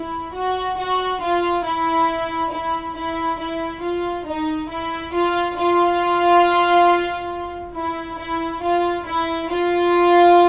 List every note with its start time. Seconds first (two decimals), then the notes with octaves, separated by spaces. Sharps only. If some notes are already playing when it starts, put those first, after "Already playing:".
Already playing: E4
0.34 F#4
0.78 F#4
1.22 F4
1.65 E4
2.51 E4
2.96 E4
3.39 E4
3.82 F4
4.26 D#4
4.70 E4
5.13 F4
5.56 F4
7.74 E4
8.18 E4
8.62 F4
9.05 E4
9.50 F4